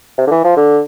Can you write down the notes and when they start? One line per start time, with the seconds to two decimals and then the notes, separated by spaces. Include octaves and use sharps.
0.18 C3
0.27 D3
0.31 E3
0.44 F3
0.57 D3